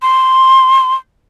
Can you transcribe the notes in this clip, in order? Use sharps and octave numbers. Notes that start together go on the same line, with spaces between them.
C6